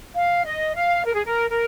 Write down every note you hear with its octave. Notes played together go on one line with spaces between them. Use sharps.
F5
D#5
F5
A#4
G#4
A#4
A#4